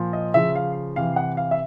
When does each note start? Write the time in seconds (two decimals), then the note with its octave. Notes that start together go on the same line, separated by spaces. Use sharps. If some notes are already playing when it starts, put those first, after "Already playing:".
Already playing: A#2 F3
0.13 D#5
0.34 C#3 F3 E5
0.55 F5
0.96 C3 E3 F5
1.16 F#5
1.37 F5
1.51 E5